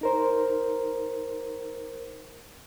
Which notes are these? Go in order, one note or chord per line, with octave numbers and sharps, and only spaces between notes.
D#4 A#4 C5